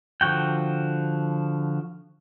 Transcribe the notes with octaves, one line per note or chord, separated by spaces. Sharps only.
D3 F3 F#4 G5